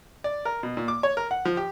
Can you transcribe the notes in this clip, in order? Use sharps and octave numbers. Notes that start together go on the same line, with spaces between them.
D5
A#4
B2
A#2
D6
C#5
A#4
F#5
F3
G4